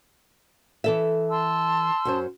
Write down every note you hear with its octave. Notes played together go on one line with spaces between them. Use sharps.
E3 A4 E5
A5 C6 E6
F#2 C#4 C5